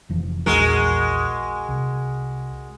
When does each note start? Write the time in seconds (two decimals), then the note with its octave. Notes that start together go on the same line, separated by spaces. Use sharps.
0.09 F1 E3 F3
0.46 A#1 E2 G#3 F#4 A#4
1.69 C2